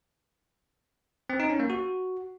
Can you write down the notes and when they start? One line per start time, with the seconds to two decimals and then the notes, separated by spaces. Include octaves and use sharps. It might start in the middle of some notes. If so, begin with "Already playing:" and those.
1.30 C4
1.40 D#4
1.50 C#4
1.60 A#3
1.70 F#4